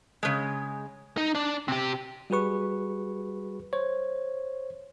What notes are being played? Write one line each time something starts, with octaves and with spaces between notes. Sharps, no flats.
C#3 G#3
D#4
D4 D5
C3 G4
G3 F#4 G#4 B4 C#6
C5 C#5